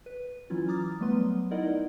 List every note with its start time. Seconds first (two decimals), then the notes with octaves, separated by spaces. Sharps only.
0.06 B4
0.50 E3 F#3 C#4 E4 F4
0.68 A#5 D6 D#6 F6 A6
1.00 F#3 G3 A3 B3 B4 C6
1.51 D#4 E4 A#4 D5 D#5 F#5